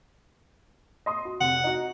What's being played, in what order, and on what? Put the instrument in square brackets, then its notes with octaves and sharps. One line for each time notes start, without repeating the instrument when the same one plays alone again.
[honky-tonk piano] D#5 C6 D#6
F#4
[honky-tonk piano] F1 [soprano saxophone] F#5
[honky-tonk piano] D#4 F#4